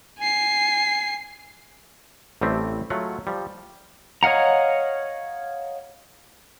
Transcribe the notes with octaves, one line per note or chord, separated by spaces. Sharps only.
G#5 C7
A1 G3 A3 C4 E5
F#3 G#3 A3 F4 F#5
F3 G3
C#5 D#5 F5 F#5 A#5